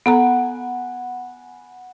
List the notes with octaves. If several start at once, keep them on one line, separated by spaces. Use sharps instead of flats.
B3 A4 F#5 G#5 A#5 B5